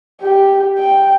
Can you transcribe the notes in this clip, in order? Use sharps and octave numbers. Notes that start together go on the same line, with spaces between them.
G4
G5